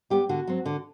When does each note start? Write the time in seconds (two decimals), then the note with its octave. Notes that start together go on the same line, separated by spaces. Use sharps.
0.10 G3 B3 G4
0.29 D3 F#4
0.47 F#3 C4
0.66 D3